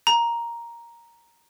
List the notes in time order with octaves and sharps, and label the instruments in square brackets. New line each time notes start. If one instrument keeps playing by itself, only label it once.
[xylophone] A#5